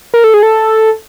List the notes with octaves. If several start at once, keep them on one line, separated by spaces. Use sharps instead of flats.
A#4
A4
G#4
A4